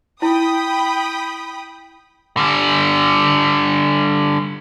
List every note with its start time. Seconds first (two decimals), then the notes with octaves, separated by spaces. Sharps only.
0.22 E4 G5 B5 D#6
2.37 D3 G3